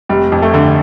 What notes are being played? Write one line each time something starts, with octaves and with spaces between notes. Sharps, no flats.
F1 G3
F2
A3
D3